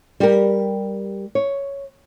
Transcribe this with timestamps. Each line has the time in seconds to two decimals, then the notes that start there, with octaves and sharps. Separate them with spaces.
0.20 G3 G4 A#4
1.35 C#5